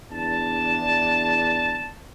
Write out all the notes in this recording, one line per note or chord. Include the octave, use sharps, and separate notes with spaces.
E2 D4 A5